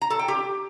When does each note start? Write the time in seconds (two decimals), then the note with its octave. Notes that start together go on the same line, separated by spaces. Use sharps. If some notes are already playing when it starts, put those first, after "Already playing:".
0.02 A#5
0.10 A4
0.19 G5
0.28 G4